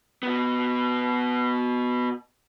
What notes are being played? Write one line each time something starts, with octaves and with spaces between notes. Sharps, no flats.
B2 B3